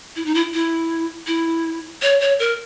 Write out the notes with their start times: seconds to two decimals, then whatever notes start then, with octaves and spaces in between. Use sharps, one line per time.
0.16 E4
0.26 D#4
0.35 E4
0.54 E4
1.27 E4
2.02 C#5
2.21 C#5
2.39 A#4